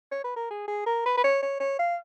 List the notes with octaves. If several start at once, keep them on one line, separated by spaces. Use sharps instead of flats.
C#5
B4
A#4
G#4
G#4
A#4
B4
B4
C#5
C#5
C#5
F5